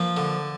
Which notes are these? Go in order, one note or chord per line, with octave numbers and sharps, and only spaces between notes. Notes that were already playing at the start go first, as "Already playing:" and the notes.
Already playing: F3 A#3 B4
D3